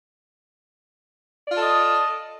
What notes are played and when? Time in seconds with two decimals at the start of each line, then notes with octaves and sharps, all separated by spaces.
1.47 D5
1.51 F4
1.55 A4
1.59 D#5